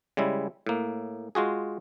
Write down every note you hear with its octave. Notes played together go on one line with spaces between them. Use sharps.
C#3 G3 G#3 E4
A2 A#3
G#3 F4 F#4 G#4